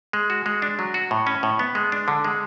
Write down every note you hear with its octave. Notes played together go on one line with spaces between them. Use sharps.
G#3
F#4
G#3
D4
F#3
F#4
A2
C#4
A2
B3
G#3
D4
D3
G#3